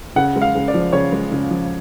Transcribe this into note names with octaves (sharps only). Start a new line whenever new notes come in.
C#3 F#5
G#3
F5
C#3
D5
F3
C#3 C#5
G#3
C#3
F3